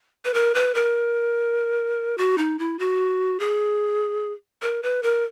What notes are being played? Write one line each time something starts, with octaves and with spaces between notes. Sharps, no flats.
B4
A#4
B4
A#4
F#4
D#4
E4
F#4
G#4
A#4
B4
A#4